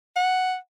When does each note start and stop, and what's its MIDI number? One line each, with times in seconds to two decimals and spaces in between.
0.16 0.55 78